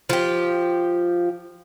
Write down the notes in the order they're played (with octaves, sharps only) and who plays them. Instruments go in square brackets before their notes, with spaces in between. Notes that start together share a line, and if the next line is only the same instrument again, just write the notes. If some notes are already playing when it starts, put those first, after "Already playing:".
[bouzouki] F3 G4